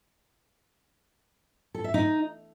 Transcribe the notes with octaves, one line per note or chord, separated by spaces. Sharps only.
A4
E5
D#4